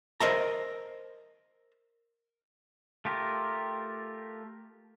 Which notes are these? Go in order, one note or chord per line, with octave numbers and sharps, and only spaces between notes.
A#4 C5 D#5 E5 A5 A#5
A3 F4 G4 A#4